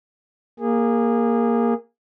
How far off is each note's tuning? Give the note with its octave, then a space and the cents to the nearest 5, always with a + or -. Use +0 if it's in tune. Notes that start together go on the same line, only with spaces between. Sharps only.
A#3 +0 G#4 -20